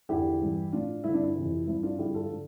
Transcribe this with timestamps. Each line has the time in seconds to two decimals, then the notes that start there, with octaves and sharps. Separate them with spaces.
0.09 E2 D3 F3 E4 G4
0.41 G2 E3
0.72 A2 F3 D4 F4
1.04 G2 D3 F3 E4
1.14 D4
1.24 E4
1.35 F2 C3 E3
1.67 G2 F3 E4
1.83 D4 F4
1.99 G2 D3 F3 E4 G4
2.14 F4 A4
2.30 D3 F3